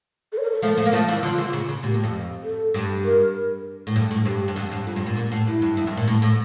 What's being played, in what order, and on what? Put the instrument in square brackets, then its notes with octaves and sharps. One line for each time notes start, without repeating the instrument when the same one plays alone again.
[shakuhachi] A4
C#5
A#4
A4
[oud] F3 A3
F3 A3
A#3
F3 A3
E3 G3
[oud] D3 F3 [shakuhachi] F4
[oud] C#3 E3
C#3
C#3
[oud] A#2 [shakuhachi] G4
[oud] A2
F2
[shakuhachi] A4
[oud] G2
[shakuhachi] A#4
[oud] A2
G2
A2
[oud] G2 [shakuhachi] G4
[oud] G2
F2
G2
[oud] F2 [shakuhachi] F4
[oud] G2
A#2
A#2
A2
[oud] G2 [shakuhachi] E4
[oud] G2
F2
G2
A#2
A2
A2